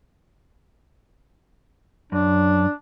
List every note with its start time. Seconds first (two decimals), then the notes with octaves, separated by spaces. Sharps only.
2.12 F#2 D4